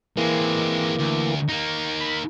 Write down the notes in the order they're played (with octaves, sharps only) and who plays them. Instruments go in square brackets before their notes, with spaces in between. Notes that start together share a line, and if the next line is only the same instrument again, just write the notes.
[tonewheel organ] E3 A#3 [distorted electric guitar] G#3 C4
[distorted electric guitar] D2
A#3 D#4
[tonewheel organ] B5